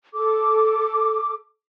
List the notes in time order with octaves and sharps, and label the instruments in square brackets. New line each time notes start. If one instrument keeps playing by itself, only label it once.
[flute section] A4 D6